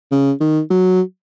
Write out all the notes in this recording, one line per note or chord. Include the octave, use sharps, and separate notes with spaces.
C#3
D#3
F#3